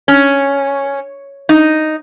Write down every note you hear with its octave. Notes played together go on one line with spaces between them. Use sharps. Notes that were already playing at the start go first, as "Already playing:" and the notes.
C#4
D#4